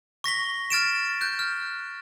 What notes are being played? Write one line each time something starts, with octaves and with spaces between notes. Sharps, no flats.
C#6 A#6 B6 G7
F6 A6 D7 E7
F#6 G6
F6